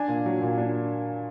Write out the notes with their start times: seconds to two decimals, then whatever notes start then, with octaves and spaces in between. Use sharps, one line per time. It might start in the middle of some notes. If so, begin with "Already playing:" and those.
Already playing: D4 G#5
0.08 A#2
0.26 F#3
0.42 A#2
0.58 D4